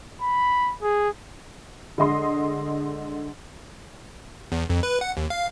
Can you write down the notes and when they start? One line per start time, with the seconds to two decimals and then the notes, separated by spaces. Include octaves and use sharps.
0.21 B5
0.82 G#4
1.98 D3 G#3 D#5 C6 D#6
4.52 E2
4.70 F2
4.83 B4
5.01 F#5
5.17 D#2
5.30 F5